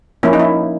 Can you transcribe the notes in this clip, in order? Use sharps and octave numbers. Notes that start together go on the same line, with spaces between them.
F3 A#3 C#4 E4
D#4
E4